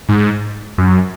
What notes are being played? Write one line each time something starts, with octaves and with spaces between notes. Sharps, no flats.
G#2
F#2